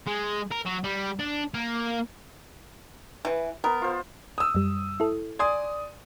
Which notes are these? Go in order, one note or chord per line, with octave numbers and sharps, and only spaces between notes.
G#3
A#4
F#3
G3
D4
A#3
E3 B4
B3 A#4
F4 C5
D#6 E6
F#2 G3
E4 A4
D5 G#5 C6 D#6 G#6